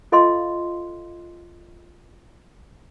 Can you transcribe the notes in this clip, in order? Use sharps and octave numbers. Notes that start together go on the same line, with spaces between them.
F4 A4 D#5 F5 C6